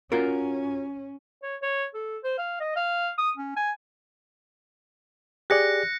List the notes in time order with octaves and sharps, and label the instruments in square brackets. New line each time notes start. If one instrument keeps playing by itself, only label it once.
[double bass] C#4 [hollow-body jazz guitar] F4 F#4 A#4
[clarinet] C#5
C#5
A4
C5
F5
D#5
F5
D#6
C#4
G#5
[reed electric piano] G4 G#4 D5 [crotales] F#6 A#6 C#7